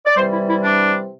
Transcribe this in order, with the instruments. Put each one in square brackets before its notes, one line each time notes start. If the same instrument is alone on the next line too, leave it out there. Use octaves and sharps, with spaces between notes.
[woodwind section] D5
C3 E3 G3 C5
E4
E4
D4